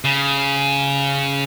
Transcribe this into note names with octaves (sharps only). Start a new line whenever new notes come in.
C#3